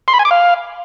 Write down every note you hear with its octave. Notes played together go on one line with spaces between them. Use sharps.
C6
B5
G#5
D6
F5